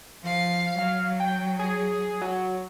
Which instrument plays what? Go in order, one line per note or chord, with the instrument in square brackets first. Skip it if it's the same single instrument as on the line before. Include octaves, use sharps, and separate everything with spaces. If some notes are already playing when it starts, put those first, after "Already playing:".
[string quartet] F3 F5
[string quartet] F#3 [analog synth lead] F5
[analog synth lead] G5
G#4
F#3